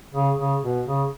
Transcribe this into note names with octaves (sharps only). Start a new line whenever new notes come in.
C#3
C#3
B2
C#3